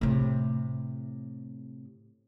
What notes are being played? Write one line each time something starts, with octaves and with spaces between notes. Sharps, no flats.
A2 C3